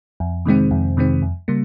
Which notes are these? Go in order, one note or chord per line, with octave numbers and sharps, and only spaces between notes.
F2
C3 D#3 G#3 C4
F2
C3 D#3 G#3 C4
F2
C#3 G3 A#3